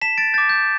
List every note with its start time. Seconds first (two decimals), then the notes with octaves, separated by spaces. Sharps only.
0.01 A5 B6 E7
0.18 A6 D7
0.34 D6 G6 A6
0.49 G6